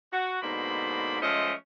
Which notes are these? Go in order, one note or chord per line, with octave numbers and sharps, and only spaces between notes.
F#4
G#2 B2 D3 A#3 C5 B5
F3 G#3 A3 C#4 C5 D#5